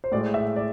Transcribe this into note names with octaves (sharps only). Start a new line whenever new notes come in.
C5
A2 G#3 D5
E5
D5